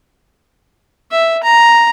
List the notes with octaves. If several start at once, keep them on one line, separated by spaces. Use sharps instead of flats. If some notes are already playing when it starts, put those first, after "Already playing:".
E5
A#5